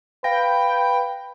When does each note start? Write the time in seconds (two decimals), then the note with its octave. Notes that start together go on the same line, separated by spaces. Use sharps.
0.24 B4 F5 G5 A#6